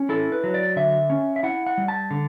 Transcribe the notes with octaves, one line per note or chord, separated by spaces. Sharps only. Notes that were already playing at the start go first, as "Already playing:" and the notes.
Already playing: C#4
E4 A4
B4
F#3
D5
D3 E5
C#4
E5
E4 F#5
F#5
G3
A5
D3